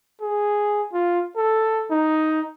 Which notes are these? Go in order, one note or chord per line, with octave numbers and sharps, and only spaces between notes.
G#4
F4
A4
D#4